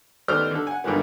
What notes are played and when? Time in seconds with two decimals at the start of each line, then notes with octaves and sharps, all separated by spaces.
0.28 D#2 A3 B3 C5 D5 F6
0.51 D3 A4
0.67 F#5 G#5
0.84 G2 D3 D#3 F3 G#3 B3